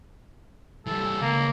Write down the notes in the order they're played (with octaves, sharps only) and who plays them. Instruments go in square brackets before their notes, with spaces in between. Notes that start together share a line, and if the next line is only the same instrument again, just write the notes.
[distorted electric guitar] E3 G3 [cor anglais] A4
[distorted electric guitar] C#2 [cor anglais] A#3